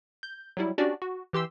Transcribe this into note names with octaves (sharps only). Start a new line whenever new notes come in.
G6
F#3 G3 E4
C#4 D4 F#4 G4 D5
F#4
E3 G4 C6 E6